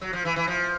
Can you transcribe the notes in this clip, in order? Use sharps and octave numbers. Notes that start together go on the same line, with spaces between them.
F#3
F3
E3
E3
F3